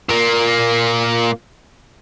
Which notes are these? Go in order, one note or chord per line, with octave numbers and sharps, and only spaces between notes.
A#2 A#3